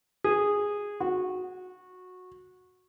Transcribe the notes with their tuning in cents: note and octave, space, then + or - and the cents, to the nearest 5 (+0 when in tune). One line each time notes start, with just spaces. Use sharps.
G#4 -10
F#4 -15